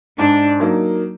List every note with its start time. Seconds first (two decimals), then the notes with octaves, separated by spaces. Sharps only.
0.19 G#2 D4
0.60 F#3 A#3 D#4 A#4